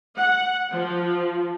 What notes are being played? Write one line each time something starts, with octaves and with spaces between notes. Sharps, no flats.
F#5
F3